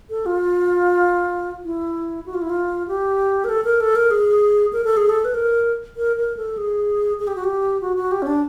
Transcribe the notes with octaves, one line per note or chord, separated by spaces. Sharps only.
A4
F4
E4
F#4
F4
E4
F4
G4
A#4
A4
A#4
A4
A#4
G#4
A#4
A4
G#4
A4
B4
A#4
A#4
A#4
A4
G#4
G#4
G4
F#4
G4
F#4
F#4
G4
C#4
D4